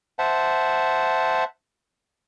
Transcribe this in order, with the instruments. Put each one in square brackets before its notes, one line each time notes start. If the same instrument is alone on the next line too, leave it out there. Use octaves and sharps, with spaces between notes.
[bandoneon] C5 E5 F#5 A5